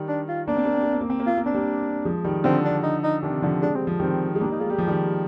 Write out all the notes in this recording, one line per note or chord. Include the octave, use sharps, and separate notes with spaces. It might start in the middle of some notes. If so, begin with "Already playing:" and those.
Already playing: D#3 G3
D4
F4
A#3 D4
C4
A#3
C4
A#3
C4
A#3
C4
A#3
C4 F4
A#3
C4 D4
G3 A#3
F3 G#3
D#3 G3
D3 F3 C4
D4
D#4
D#4
C3 D#3 D4
D3 F3
G#3 D4
G3 C4
F3
D#3 G3 C4
G#3
G3 A#3 D4
D#4
G#3 F4
G3 G4
F3
D#3 G3